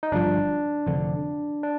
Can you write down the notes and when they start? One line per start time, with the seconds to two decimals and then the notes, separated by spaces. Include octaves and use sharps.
0.03 D#4
0.12 G1 G2 F3 D4
0.87 F1 F2 D3
1.63 D4